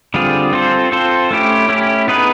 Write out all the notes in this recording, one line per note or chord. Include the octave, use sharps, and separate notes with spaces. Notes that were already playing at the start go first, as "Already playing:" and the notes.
D3 G3 C4 F4 G#4
C4 F4 A4 C5
C4 F4 A4 C5
A3 C#4 E4 G4
A3 C#4 E4 G4
B3 D#4 G#4 B4